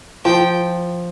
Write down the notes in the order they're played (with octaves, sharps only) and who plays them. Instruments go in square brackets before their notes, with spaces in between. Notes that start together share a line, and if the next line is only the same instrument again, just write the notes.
[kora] F3 [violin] G5